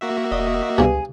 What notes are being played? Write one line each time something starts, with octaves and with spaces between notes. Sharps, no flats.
A#3 F#4 E5
E1 D#5
C#2 G2 B2 G#4